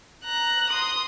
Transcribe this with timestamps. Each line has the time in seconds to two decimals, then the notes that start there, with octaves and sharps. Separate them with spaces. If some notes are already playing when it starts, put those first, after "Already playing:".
0.25 A#5 F#6
0.70 C6 D#6